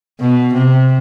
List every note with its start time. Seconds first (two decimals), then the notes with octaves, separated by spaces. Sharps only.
0.20 B2
0.54 C3